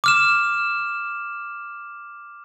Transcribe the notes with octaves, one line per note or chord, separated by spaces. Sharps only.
D6 F6 E7